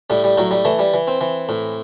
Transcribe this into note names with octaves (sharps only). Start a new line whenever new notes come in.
A2 G3
G3
A2 F#3
G3
E3 A3
G3
E3
C4
E3
A2